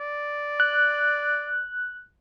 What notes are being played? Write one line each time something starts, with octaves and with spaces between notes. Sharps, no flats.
D5
F#6